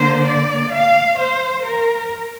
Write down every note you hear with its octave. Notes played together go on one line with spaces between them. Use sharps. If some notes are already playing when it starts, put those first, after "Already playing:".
Already playing: D3 A#3 C5
D5
F5
C5
A#4